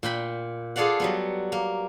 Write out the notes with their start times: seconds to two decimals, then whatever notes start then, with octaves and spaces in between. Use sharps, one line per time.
0.03 A#2 G5 B5
0.76 F4 G#4 A4 D5 F5 F#5
1.00 F#3 G3 B3
1.52 A#3